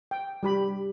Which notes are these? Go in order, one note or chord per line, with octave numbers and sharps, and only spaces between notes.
G5
G3 G4 B5